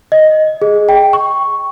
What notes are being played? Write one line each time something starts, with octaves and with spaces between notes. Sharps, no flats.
D#5
G#4
G5
C#6